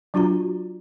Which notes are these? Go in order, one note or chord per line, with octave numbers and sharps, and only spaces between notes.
F#3 D4 F4 F#4 A#5